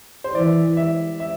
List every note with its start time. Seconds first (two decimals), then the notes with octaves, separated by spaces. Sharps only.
0.24 C5
0.34 E3 D5
0.77 E5
1.20 E5